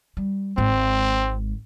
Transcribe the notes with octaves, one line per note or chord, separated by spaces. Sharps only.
G3
G#1 G#2 C4